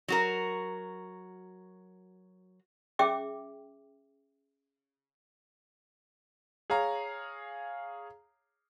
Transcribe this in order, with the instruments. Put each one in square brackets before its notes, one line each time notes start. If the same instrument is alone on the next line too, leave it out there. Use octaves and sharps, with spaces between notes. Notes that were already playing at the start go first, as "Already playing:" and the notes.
[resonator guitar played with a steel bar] F#3 F#4 A#4
[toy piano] C#4 G#4 E5 G5 D6
[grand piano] G#4 C#5 F5 A#5